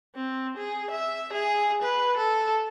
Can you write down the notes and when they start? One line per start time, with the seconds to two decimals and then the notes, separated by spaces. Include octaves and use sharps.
0.15 C4
0.57 G#4
0.91 E5
1.33 G#4
1.82 B4
2.18 A4